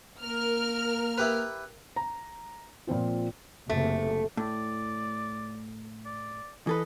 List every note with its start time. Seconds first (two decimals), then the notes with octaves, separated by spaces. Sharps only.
0.21 A#3 A#4 F6
1.18 E4 G4 B4
1.96 A#5
2.87 A#2 F3 C4 F4
3.69 F#1 C3 A3
4.37 A2 D5
6.05 D5
6.67 E3 A4 B4 D#5